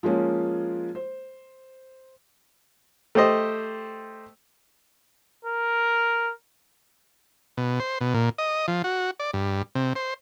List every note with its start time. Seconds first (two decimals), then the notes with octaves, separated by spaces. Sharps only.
0.03 F3 G#3 A#3 C#4 F4
0.95 C5
3.15 A3 G4 C5 D#5
5.44 A#4
7.57 B2
7.80 C5
8.01 B2
8.14 A#2
8.38 D#5
8.68 F3
8.84 F#4
9.20 D5
9.33 G2
9.75 C3
9.96 C5